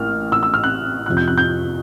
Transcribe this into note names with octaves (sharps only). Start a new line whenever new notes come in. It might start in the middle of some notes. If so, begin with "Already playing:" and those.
Already playing: A1 A#3 F6
E6
E6
F6
F#6
F2 C3 F3 F#6
G6
F#6
G6